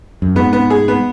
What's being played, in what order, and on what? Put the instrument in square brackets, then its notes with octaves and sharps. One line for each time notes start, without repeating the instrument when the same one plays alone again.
[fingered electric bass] F#2
[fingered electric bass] G#2 [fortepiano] B3
[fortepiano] B3
G#4
B3